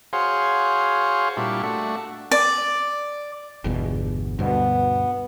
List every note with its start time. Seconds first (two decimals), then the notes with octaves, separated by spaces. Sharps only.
0.13 F#4 G#4 C5 C#5 F5 C6
1.37 A#2 G3 D4 E4 C#6
1.63 A3 D4 F#4
2.31 D5
3.64 G1 E2 B2
4.39 D2 G2 B2 B3